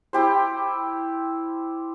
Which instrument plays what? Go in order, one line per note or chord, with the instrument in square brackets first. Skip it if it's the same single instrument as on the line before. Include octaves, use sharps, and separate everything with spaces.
[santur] E4 G4 C5